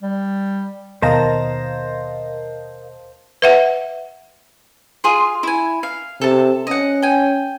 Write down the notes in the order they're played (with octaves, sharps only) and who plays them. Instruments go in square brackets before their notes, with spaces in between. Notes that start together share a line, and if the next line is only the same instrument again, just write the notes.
[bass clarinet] G3
[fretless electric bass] D#2 B2 [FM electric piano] A#4 D#5 F5 [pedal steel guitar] C5 A5 A#5
[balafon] B4 E5 F#5
[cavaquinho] F4 G#4 C6
E4 G#5
F5
[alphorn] C3 [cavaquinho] A4 A5
[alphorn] C#4 [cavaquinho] D#5 F#5
[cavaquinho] G5 G#5